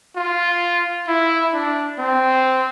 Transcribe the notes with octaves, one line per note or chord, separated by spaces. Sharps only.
F4
E4
D4
C4